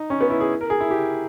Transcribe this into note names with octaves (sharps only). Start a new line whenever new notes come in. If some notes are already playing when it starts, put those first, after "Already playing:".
Already playing: D#4
C#4
B3
E4
G#4
A#4
G#4
E4
G4